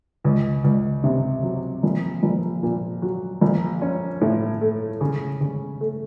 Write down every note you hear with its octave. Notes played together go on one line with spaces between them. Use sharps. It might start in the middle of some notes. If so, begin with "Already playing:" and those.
C#2
C#2
C3
F#3
A#1
A#1
A#2
F#3
A#1
C#4
A2
A3
C#3
C#3
A3